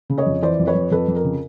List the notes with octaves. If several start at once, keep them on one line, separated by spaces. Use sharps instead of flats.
C#3
C#5 D#5
F2
E3 C5 D5
F2
B4 C#5
F2
F2 A4 B4
F2
A#4
C#3